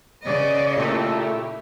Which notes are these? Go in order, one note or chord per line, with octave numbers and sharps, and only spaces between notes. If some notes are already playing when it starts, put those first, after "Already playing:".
C#3 B3 D5 D#5
A#2 A3 E4 G4